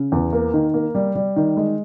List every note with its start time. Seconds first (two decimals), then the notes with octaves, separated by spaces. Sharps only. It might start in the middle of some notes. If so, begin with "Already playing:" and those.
Already playing: C#3
0.12 E2
0.33 A#3
0.54 D#3
0.74 A#3
0.95 G3
1.15 G3
1.36 D#3
1.57 G#3